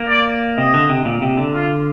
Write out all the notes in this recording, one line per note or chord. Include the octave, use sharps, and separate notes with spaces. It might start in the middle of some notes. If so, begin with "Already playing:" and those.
Already playing: A#3
D5
C3 D#5
D3
C3
A#2
C3
D3
F4